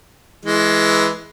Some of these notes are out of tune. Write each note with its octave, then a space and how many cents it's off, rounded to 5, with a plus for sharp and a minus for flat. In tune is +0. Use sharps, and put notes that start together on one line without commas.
E3 +0 G#3 +15